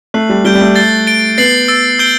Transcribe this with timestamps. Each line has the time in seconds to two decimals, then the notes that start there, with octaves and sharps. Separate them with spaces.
0.14 A3 F#6 C7 F#7
0.29 G3
0.45 G3 G6 D7 G7
0.55 G3
0.61 A3
0.76 A6 C7 G7
1.07 A6 D7 G7
1.38 B3 A6 C7 F#7
1.68 E6 A6 D7
1.99 E6 G6 D7 G7